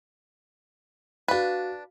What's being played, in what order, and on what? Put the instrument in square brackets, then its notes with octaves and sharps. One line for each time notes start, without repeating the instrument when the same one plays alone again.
[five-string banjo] D4 B4 [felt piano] F#4 F5